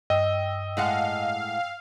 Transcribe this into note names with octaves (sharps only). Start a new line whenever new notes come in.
G2 D#5 G5 E6
A2 G#3 F5 F#5